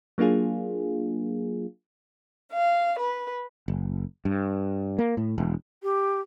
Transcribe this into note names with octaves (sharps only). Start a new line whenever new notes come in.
F#3 A#3 D4 F4 G#4
F5
B4
F#1
G2
A#3
A2
E1
G4